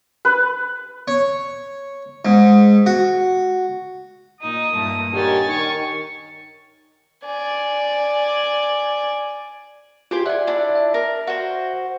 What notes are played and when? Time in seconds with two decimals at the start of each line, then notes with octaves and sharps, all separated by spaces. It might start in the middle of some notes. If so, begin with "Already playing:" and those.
0.25 B4
1.08 C#5
2.25 G#2
2.86 F#4
4.41 A#2 D#4 D#6
4.72 G2 A#2 A3
5.13 D3 D#3 G4 C#5 G#5 A6
5.49 D#3 C#6
7.26 D5 G#5
10.11 F4 G4 G#4 C5
10.26 D5 E5 F#5 G#5
10.47 D4 E4
10.76 E5
10.94 A#4
11.27 F#4 C5